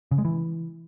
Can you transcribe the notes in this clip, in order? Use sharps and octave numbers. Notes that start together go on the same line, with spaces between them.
C#3
G#3
E3